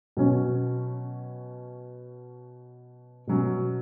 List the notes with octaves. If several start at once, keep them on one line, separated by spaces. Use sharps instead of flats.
B2 F#3 C#4
B2 F#3 C#4